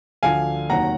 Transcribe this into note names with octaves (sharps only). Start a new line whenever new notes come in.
D2 D3 F3 F5 G#5
F1 D#2 D#3 F#3 F#5 A#5